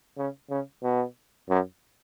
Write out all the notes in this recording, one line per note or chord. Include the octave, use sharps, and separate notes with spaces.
C#3
C#3
B2
F#2